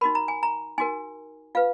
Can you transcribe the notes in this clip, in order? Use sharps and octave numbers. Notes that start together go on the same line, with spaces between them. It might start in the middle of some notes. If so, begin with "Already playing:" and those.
D#4 F#4 A#4 B5
A#5
G#5
A#5
D#4 F#4 A#4 G#5
F4 B4 F5